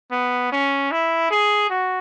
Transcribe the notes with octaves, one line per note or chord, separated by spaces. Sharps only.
B3
C#4
E4
G#4
F#4